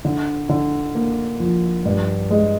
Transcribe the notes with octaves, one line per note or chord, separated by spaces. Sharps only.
D3
D3
A#3
F3
G2
G#3